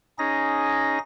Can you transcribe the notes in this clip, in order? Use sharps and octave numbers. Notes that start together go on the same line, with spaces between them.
C#4 D#4 G#4 A#6